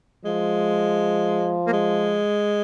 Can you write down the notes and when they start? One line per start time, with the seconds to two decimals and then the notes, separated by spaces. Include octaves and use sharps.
0.25 F3 G#3
1.66 A#3
1.73 G#3